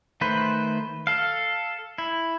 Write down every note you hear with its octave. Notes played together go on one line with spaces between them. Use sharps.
D#3 A3 B4 C5
A4 F5
E4